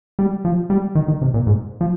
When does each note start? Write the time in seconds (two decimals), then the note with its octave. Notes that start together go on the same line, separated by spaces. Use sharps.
0.19 G3
0.45 F3
0.70 G3
0.95 D#3
1.08 D#3
1.22 C3
1.34 A#2
1.47 G#2
1.81 F3